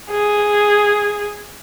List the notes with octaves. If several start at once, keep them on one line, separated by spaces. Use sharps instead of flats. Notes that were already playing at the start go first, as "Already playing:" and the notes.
G#4